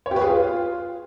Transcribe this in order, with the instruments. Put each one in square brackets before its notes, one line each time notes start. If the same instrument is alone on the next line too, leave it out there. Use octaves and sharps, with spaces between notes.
[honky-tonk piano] C#5
G4
B4
G#4
F4